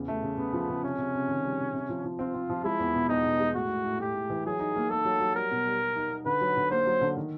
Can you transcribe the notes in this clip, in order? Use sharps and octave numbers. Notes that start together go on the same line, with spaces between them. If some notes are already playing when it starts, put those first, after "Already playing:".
Already playing: E2 C#3
A3
C#3
C#3 B3
F3
C#3
C3 C#4
C3
C3
D#3
G3
C3
C3
F3
F3
C4 F4
C4
F3
G#3 E4
E2
B2
E2 D#4
B2
G#3
A2 F#4
A2
A2
A2 G4
A2
E3
F#3 G#4
D#4
A#3
A#3 A4
F#3
F#3
G3 A#4
B2
G3
G3
D#4
D#4
D3 B4
F#3
D3
A#3 C5
F#3
D3
D#3